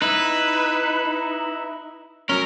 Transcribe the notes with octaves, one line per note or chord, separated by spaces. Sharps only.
D#4 E4 B4
F#3 C#4 A#4